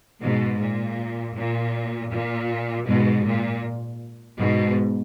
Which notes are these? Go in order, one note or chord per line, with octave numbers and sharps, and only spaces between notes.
G#2 B2
A#2
A#2
A#2
G#2 B2
A#2
G#2 B2